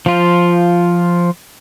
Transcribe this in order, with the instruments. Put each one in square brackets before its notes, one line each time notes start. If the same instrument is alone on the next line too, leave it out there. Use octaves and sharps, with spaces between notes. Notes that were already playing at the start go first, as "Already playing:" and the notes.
[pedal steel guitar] F3 F4